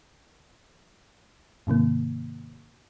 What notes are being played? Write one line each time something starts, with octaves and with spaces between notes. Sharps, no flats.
G#2 C3 D#3 A#3